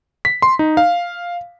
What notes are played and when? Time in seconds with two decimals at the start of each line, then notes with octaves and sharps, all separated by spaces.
0.25 B6
0.42 C6
0.59 D#4
0.77 F5